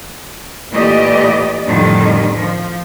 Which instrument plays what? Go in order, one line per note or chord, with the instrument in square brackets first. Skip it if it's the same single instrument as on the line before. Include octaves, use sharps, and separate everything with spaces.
[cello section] A#2 E3 A3 G4 D5 D#5
F2 A2 D3 D#3 G3
F3